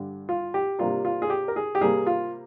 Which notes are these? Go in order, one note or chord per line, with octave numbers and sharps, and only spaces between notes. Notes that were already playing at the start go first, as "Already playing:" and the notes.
Already playing: G2 D3 G3 D4
F4
G4
C3 G3 A#3 D4 F4
F4
G#4
G4
A#4
G#4
G4
C3 G3 A#3 G#4
F4